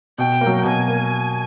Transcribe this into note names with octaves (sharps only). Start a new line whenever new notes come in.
B2 G5
A#3
F#3
B2 G#5
A#3